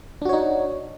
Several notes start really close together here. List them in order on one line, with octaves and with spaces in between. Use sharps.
D4 F#4 C#5 D#4